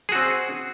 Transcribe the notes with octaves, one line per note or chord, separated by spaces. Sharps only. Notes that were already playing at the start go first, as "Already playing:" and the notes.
C4 F#4 G#4